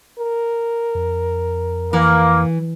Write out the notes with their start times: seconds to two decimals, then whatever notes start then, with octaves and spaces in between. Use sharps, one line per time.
0.19 A#4
0.95 F2
1.93 E3 A#3